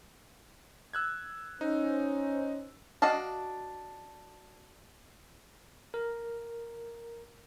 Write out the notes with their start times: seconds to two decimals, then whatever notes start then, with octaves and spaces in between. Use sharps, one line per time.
0.93 E6 F#6 G#6
1.61 C#4 D#4 C5
3.02 D4 F#4 D#5 F5 A5
5.94 A#4